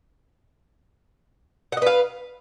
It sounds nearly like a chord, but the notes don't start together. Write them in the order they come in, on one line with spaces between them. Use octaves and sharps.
F#5 D#5 B4 F5